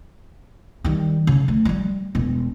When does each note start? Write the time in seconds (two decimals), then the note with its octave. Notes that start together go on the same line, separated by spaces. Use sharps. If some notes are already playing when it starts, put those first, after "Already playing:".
0.84 D#3 G3
1.27 C#3
1.48 D2
1.65 F#3 G3
2.15 E1